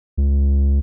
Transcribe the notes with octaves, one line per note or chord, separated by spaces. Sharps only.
C#2